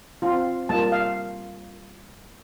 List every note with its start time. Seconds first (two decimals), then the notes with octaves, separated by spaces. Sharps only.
0.22 C4 F4
0.69 G3 A#3 F4 A5
0.92 F5